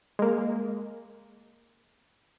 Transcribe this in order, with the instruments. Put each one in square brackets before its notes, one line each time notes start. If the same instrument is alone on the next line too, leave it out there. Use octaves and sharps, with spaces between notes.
[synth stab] G#3 A#3